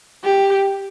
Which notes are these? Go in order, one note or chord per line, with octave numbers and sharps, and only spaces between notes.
G4